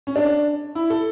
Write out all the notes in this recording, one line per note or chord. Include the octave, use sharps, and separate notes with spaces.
C#4
D4
E4
A4